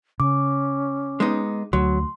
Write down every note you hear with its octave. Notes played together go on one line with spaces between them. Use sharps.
C#3 C#4 D6
G#3 B3 D#4
D2 F#3 C6